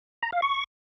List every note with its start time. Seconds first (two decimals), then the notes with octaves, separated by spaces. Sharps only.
0.22 A#5
0.32 F5
0.42 C#6